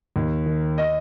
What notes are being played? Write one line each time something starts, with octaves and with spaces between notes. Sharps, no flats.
D#2
D#3
D#5